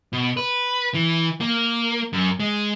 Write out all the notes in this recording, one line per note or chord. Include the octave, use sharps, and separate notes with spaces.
B2
B4
E3
A#3
F#2
G#3